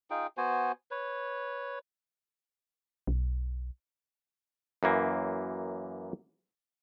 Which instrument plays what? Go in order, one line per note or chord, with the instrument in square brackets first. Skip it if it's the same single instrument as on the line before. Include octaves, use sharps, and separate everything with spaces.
[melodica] D#4 F4 G#4 G5
B3 F#4 C5 G#5
B4 C#5
[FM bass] B1
[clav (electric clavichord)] F#2 E3 A#3